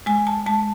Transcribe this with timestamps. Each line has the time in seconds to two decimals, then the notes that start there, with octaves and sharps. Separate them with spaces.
0.06 G#3 G#5
0.27 A5
0.46 G#3 A5